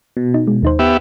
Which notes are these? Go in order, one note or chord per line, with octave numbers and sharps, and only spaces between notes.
B2
D#4
G#3
D#2 D#4 C5
B3 G4 E5